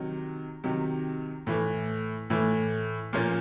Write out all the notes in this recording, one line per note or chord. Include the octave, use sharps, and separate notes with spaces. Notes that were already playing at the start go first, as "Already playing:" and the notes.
Already playing: C3 D#3 F#3
C3 D#3 F#3
A2 E3 A3
A2 E3 A3
A#2 F3 A#3 C#4